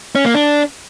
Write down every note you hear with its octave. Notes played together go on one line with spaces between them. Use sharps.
C#4
A#3
D4